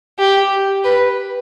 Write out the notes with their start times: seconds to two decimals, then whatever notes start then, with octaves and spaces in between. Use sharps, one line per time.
0.19 G4
0.84 B4